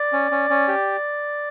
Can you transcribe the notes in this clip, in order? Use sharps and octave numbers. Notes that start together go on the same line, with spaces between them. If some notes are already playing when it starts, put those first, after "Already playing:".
Already playing: D5
C#4
C#4
C#4
G4